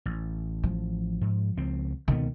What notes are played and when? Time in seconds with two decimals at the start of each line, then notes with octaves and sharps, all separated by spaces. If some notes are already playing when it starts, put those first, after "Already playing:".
0.06 A1
0.63 F3
1.21 G#2
1.57 C#2 C4
2.08 C#2 B2 D#3 B3